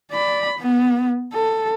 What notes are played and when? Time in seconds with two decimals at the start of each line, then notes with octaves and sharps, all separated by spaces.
0.12 D5 B5
0.59 B3
1.33 A4